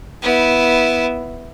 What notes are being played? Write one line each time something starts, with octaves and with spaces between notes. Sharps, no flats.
B3 E4